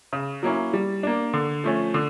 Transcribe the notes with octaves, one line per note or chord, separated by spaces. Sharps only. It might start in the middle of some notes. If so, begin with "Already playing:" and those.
C#3
F#3 A#3 C#4 E4
G3
A#3 D4
D3
F3 A3 C#4
D3